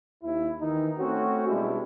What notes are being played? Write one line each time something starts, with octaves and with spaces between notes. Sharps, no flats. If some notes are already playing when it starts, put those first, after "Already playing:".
D#2 E4
D#3 E3 D#4
A3 C4 C#4 F#4
B2 G3 G#3 D4 E4 G4